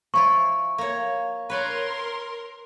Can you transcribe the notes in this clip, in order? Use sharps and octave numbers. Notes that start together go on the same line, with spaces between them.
F3 E4 F4 C#6
A#3 C#5
A#4 B4 C#5 D5 C6